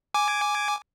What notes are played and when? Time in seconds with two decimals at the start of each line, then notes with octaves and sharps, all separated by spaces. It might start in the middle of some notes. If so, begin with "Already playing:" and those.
0.14 G#5 D6